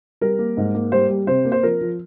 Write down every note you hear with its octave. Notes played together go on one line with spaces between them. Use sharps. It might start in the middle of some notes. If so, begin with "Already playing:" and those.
G3 A#4
A#3
G#2
A#3
G3 C5
G3
C3 C5
A#3
C5
F3 A#4
F3